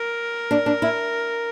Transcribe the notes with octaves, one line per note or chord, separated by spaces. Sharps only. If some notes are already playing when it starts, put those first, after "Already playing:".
Already playing: A#4
D4
D4
E4